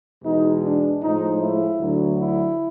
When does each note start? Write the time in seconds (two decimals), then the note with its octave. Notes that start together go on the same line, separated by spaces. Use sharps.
0.24 E2 B2 G#3 D#4
0.64 D4
1.02 A2 F3 G#3 D#4
1.41 E4
1.80 D2 D3 F#3
2.20 E4